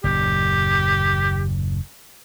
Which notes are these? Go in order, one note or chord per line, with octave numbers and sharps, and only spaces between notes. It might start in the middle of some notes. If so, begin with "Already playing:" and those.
F#1 D#2 A#2 G4